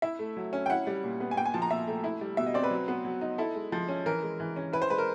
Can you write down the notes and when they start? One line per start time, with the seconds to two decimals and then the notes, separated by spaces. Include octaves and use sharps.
0.02 E4 E5
0.19 A3
0.37 F#3
0.53 C#4
0.66 G5
0.70 E4 F#5
0.87 G3
1.04 A#2
1.20 B3
1.31 G#5
1.37 A#2 G5
1.46 G#5
1.54 F3 A5
1.62 A#5
1.70 A#2 E5
1.87 A3
2.04 E4
2.21 G3
2.37 B2 E5
2.46 D#5
2.54 C4 D5
2.64 B4
2.71 F#3
2.88 B3
3.05 F#3
3.21 D#4
3.38 E4 A4
3.55 G#3
3.72 F3
3.88 C#4
4.06 E3 A#4
4.23 G#3
4.40 E3
4.56 C#4
4.73 E4 B4
4.82 C5
4.90 G#3 B4
4.98 A#4